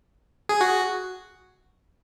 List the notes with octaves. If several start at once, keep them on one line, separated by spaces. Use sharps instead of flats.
G#4
F#4